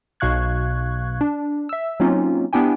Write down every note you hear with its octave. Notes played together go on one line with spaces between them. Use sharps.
B1 B2 F5 C#6 F#6 G#6
D4
E5 E6
F#3 A#3 C4 C#4 D#4 F4
B3 D4 E4 G4 G5 G#5